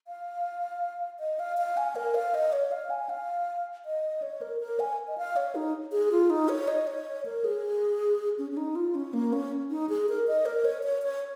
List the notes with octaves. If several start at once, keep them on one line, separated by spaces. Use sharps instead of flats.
F5
D#5
F5
F5
G#5
A#4
F5
D#5
C#5
F5
G#5
F5
D#5
C#5
A#4
A#4
G#5
D#5
F5
C#5
D#4
G#4
F4
D#4
C#5
D#5
C#5
A#4
G#4
C#4
C#4
D#4
F4
C#4
A#3
C#4
D#4
G#4
A#4
D#5
A#4
C#5
C#5
C#5